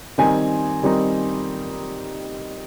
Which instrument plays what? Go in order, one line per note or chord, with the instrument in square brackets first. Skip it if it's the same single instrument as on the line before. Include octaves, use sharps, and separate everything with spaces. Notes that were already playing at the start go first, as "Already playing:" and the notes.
[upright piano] D#3 G3 C4 D#4 G#5
D#3 G3 C4 D#4